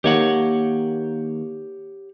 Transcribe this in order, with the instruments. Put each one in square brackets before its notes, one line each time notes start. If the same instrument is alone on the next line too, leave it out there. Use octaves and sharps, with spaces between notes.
[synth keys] D#3 A#3 [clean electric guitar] G4 C#5 F#5